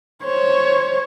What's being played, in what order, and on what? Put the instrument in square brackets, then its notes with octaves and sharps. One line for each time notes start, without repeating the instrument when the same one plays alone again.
[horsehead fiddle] C5 C#5